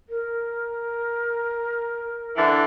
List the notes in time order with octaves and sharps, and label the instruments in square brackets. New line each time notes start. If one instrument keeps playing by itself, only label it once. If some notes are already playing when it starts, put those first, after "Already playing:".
[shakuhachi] A#4
[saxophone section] D3 E3